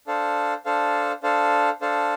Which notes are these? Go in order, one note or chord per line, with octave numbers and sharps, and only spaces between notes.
D4 A4 C5 F5
D4 A4 C5 F5
D4 A4 C5 F5
D4 A4 C5 F5